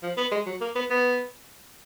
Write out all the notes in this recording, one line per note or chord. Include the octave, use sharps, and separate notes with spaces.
F3
B3
G#3
F#3
A#3
B3
B3